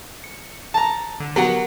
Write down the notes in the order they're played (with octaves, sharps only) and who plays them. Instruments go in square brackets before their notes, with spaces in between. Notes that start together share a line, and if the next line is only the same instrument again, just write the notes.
[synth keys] C#7
[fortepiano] A5 A#5
[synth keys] D3
[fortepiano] F#3 F#5 [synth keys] B3 G4 A#4